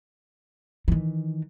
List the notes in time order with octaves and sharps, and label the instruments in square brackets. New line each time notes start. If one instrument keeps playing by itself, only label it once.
[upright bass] D#3 E3